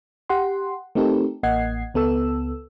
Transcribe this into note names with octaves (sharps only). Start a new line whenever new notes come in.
G4 F#5 C6
A3 C4 D#4 G4 A4 A#4
A1 A#3 D#5 F#5 G#6 C7
C#2 B3 A4 E6